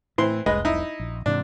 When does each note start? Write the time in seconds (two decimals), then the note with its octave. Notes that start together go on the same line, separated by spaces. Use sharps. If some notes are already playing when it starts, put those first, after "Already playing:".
0.18 A2 E3 C4 C6
0.46 F1 C2 G#3 B4 D#5
0.65 D#4 E4
1.00 A#1
1.26 G#2 C3 E3 D4